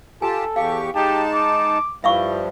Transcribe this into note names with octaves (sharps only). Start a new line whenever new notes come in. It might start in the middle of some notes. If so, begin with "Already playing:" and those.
F4 G4 A4 G#5 A5
E2 G4 F5 C#6
G#3 D#4 G4 A5
D6
G2 F3 G3 E4 E5 F5 C#6